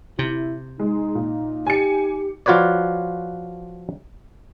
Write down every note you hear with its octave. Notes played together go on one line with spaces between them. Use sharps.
C3 E4
G#3 D#4
A#2
G4 G#5 C#7
F3 F4 F#4 B4 C#5 D5